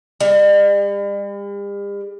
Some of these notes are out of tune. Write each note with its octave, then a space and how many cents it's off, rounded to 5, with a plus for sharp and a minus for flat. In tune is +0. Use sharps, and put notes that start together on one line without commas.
G3 +45